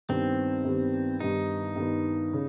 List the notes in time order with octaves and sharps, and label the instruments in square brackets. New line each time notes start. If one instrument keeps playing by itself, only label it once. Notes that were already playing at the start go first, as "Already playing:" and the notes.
[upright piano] G2 D#3 G3 B3 [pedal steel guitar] C4
[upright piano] G2 D#3 G3 B3
[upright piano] G2 D#3 G3 B3 [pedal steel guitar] D#4
[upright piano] G2 D#3 G3 B3
C#3